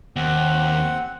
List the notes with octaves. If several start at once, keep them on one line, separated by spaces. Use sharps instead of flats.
D#2 C4 F#5